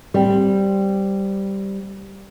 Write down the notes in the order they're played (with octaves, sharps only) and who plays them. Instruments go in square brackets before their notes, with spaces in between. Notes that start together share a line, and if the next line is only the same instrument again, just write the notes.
[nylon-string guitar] G3 C4